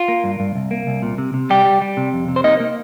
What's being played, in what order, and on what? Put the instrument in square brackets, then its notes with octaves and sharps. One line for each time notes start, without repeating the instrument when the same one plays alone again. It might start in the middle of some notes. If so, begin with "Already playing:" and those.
Already playing: [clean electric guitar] F4
A#3
G2
G2
C2
A#3
C2
A#2
C3
C3
C2 G3 G4
G3
G3
C3
F2
C3
C5
A#3 D#4 D#5
A#3